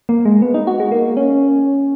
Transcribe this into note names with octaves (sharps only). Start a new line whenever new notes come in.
A#3
G#3
B3
D#4
F#4
G#3
A#3
C#4